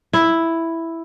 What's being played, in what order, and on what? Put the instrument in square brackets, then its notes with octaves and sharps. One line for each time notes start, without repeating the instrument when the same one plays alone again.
[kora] E4